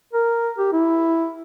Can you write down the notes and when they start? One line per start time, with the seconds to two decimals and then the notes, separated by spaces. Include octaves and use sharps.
0.13 A#4
0.58 G4
0.73 E4